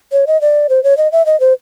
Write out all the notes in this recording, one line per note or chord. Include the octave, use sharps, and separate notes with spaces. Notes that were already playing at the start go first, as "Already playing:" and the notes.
C#5
D#5
D5
C5
C#5
D#5
E5
D#5
C5